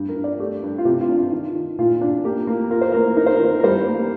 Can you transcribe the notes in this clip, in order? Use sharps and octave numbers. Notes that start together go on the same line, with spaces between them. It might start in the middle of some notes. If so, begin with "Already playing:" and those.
Already playing: G2
A#4
G2
D5
A3 G4
G2
F4
C3 G4
F4
D4
F4
D#3
D#3
A#2 F4
D4
A#3 G4
A#3
F4 A#4
C5
A#3 A#4
D#4 A#4
C5
A#4
D#3
A#4
G3 C5
A#3